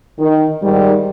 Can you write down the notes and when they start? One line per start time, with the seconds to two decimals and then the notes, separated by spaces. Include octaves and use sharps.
0.19 D#3
0.63 G#2 D#3 G3